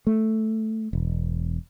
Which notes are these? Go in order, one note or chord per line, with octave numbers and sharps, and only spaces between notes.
A3
E1